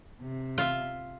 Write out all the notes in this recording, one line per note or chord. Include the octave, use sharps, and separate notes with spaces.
C3
F4 E5